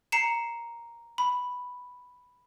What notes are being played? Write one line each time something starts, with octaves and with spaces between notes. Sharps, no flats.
A#5 C7 C#7 E7
B5